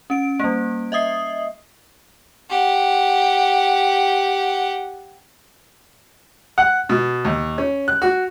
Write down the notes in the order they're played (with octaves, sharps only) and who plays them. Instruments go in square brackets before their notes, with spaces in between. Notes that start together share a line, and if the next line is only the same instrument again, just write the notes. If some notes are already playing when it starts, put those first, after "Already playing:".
[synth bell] C#4 D7
G3 A#3
D#5 E5 D#6 C7
[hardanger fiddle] G4 F#5
[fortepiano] F#5
B2
D#2
C#4
F#6
F#4